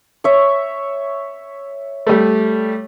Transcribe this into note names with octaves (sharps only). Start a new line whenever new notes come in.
C#5 E5
G3 A3